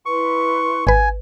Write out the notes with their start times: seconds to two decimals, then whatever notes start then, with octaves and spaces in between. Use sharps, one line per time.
0.06 E4 B4 C6 C#6
0.87 G#1 B4 G#5